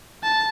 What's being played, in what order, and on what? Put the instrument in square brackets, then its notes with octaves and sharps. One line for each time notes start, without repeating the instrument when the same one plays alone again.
[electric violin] A5